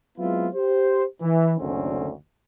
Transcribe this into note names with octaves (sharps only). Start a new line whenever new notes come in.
F#3 G#3 B3 C4 E4 F4
G4 C5
E3
F#1 D2 D3 D#3 C4 C#4